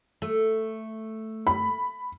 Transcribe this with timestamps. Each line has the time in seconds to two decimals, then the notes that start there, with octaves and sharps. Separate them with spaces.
0.22 A3
1.47 B5